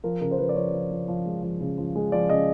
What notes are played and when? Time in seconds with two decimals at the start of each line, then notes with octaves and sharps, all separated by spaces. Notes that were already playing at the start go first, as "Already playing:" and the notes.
0.04 F3 A#4
0.21 C#3 A#4
0.31 C5
0.38 F3 B4
0.49 D5
0.56 F3 C#5
0.73 F3
0.91 F3
1.08 F3
1.26 G#3
1.43 F3
1.60 C#3
1.78 F3
1.96 G#3
2.12 F3 D5
2.29 C#3 D#5